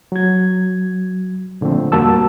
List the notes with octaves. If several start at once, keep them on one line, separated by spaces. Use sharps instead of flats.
F#3 G#6
A#2 D3 F3 A3 C4
E2 G3 A#3 F#4 A5 E6